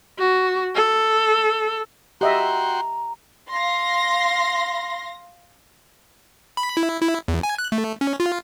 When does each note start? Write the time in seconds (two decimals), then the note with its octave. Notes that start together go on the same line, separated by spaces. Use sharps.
0.19 F#4
0.75 A4
2.21 F#4 G4 D#5 E5 G5 A#5 C6
3.53 F5 C6 A#6
6.57 B5
6.77 E4
7.02 E4
7.28 E2
7.43 G#5
7.58 F#6
7.72 A3
8.01 C#4
8.20 F4